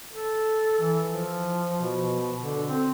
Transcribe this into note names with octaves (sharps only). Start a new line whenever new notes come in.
A4
E3
F3
B2
D3
C4